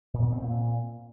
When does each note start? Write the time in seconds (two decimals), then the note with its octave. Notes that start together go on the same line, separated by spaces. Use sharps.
0.14 A#2
0.23 B2
0.33 C4
0.42 A#2